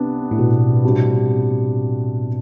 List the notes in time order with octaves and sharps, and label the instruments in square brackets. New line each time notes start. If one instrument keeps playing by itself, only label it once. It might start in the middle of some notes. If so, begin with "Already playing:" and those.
Already playing: [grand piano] C3 B3 D4
[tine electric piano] A2
B2
[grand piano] C3 G3 D4 F#4